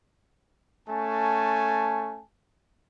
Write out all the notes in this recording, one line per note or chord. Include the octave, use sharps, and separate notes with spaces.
A3 C#4 G#5 A5